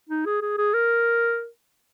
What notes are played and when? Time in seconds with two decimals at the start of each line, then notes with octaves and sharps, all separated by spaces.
0.09 D#4
0.26 G#4
0.41 G#4
0.58 G#4
0.74 A#4